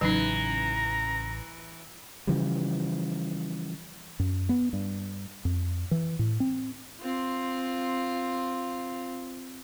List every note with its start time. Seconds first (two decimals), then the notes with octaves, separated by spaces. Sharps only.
0.01 A1 C#3 E3 F#3 D#4 A#5
2.27 C#3 E3 F3 G3
4.19 F#2
4.49 B3
4.73 G2
5.45 F2
5.91 E3
6.19 A2
6.40 C4
7.00 C4 F4